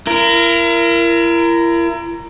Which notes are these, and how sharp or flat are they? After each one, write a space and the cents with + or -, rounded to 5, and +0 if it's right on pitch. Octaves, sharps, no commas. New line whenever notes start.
E4 +40 A#4 +0